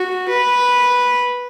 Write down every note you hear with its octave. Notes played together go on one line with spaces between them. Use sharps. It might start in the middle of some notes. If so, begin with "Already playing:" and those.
Already playing: F#4
B4